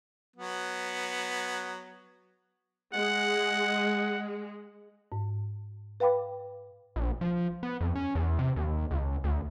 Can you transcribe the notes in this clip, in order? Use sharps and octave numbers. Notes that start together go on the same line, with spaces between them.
F#3 B3
G#3 F#5
G#2
B4 F5 G5 B5 D6
A#1
F3
B3
F2
C#4
E2
C3
D#2
C#2
D2